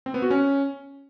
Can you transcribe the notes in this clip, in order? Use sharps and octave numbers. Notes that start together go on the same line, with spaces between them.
C4
B3
F#4
C#4